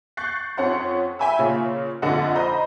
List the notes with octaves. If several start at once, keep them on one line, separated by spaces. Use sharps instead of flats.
C#6 F#6 G6 A6 C7
F2 C#4 F#5 C6
E5 G5 G#5 B5 E6
A#2 C#3 C#4 F4
A#1 F2 D3 D#5 F#5
C5 D#5 A#5 B5